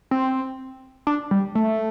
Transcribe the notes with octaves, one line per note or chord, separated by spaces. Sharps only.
C4
D4
G3
A3